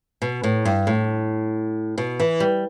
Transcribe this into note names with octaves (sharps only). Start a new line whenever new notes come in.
B2
A2
G2
A2
B2
E3
G3